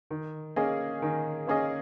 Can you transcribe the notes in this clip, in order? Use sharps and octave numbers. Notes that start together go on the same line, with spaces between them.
D#3
A#3 C#4 G#4 D#5
D#3
A#3 C#4 G#4 D#5